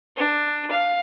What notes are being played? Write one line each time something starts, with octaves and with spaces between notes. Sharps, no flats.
D4
F5